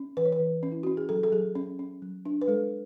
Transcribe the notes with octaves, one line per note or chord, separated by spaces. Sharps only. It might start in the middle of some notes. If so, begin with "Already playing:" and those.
Already playing: C#4
E3 B4
C#5
B4
E3
C#4
E4
C#4 F#4
G#4
F#3 A4
A4
F#3 G#4
C#4
C#4
F#3
D4
B4
G#3 A4